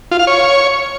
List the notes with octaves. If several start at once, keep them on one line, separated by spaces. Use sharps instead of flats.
F4
F5
C#5